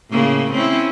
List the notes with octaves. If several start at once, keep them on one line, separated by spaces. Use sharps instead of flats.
A2 C#3 A#3
C4 C#4 E4